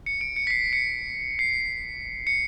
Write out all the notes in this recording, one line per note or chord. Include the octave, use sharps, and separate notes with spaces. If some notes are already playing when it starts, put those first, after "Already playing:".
C#7
D7
C#7
B6
C7
C#7
C7
C#7